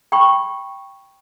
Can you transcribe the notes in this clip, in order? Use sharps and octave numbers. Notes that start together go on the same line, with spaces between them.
G5 B5 C#6